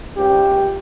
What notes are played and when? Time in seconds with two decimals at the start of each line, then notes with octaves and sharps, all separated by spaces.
0.17 C#2 G4